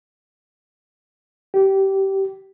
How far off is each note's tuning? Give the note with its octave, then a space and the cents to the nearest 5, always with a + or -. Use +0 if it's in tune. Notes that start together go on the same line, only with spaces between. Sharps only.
G4 -20